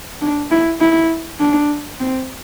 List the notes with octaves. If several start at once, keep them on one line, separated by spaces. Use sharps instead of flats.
D4
E4
E4
D4
C4